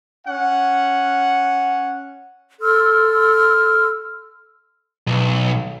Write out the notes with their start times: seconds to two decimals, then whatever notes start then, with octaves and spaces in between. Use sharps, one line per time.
0.26 C#4 F#5
2.61 A4 C6 E6 F6
5.07 B1